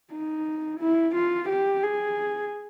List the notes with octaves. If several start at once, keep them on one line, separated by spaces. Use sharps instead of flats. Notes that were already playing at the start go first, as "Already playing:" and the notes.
D#4
E4
F4
G4
G#4